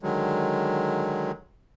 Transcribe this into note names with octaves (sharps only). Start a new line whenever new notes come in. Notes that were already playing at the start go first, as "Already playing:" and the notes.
D3 D#3 F#3 G#3